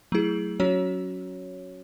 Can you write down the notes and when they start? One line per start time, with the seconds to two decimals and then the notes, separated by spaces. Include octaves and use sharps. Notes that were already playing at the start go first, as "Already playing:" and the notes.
0.12 F#3 A3 E4 G#4
0.60 F#3 C#4 F#4 C#5